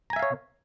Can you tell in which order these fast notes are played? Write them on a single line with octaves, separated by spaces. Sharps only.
A#5 G#5 E5 F5 C#5